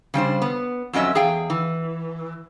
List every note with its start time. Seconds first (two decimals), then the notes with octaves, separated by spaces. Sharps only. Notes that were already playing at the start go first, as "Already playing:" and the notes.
0.14 C#3 G3 D4 C5
0.42 B3
0.93 F2 F#3 C#4 D#5 E5
1.15 E2 G#4 F5 G5
1.50 E3